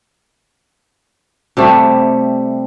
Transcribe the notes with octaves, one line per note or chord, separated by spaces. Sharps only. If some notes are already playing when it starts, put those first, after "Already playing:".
C3 G3 A3